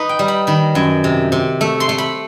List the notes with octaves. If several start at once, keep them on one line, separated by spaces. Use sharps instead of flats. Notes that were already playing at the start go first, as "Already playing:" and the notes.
Already playing: D#4 B4
G5
G3
B5
D#3 B5
F#2
C3
C3
A3
C6
A3
B5